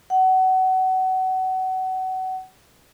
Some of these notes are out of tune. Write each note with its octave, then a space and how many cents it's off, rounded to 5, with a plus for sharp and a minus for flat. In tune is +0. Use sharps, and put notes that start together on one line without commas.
F#5 +25